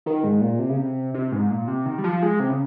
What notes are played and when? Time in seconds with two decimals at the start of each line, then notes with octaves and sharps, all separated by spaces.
0.06 D#3
0.24 G#2
0.41 A#2
0.59 C3
0.69 C#3
0.77 C3
1.14 C3
1.32 G#2
1.50 A#2
1.68 C3
1.86 D#3
1.98 G3
2.04 F3
2.23 G#3
2.40 C3
2.49 C#3